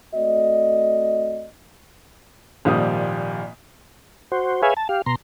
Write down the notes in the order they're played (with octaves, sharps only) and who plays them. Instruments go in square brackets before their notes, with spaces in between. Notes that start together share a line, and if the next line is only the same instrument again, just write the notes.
[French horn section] A3 C4 F#4 D5 D#5
[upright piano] G#1 A#2 F3 G3 D#6
[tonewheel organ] F#4 C5
G#4 B4 C#5 E5 F5 G#5
A5
G4 F5
B2 A#5 C6